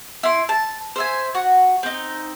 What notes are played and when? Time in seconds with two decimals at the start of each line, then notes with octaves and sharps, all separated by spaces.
0.23 E4 C6
0.49 A5
0.96 C5 E5 G#5
1.35 F#4
1.83 C4 D#4